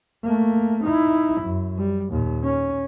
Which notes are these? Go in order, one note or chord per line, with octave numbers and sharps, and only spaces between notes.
A3 A#3
D#4 E4
F#2
G3
D#2 A#2
C#4